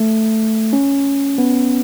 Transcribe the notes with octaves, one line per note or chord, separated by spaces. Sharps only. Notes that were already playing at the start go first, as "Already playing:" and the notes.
Already playing: A3
C#4
B3